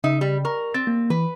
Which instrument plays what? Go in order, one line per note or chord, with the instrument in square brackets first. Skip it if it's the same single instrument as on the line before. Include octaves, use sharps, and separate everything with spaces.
[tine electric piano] C#3 [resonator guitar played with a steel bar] D#4 E5
[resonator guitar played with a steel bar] G3
[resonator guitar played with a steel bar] A#4 [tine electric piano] C#6
[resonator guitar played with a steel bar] C4 [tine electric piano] A6
[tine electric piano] A#3
[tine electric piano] E3 [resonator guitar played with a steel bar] B4